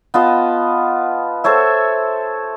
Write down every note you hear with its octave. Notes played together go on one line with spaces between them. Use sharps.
B3 F4 D#5 A5
A4 C5 C#5 E5